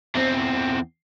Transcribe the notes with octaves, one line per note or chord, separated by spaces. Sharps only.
E2 C4